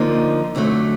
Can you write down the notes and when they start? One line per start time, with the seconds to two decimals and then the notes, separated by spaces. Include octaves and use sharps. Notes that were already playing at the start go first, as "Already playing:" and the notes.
Already playing: D3 F3 A#3 D#4
0.55 F2 D3 F#3 A3